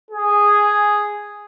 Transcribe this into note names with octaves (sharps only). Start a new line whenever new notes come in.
G#4